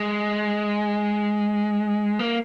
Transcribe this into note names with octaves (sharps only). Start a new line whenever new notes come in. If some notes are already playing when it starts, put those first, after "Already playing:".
Already playing: G#3
A#3